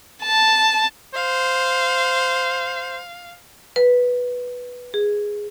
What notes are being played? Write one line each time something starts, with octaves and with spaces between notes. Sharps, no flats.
A5
C5 F5
B4
G#4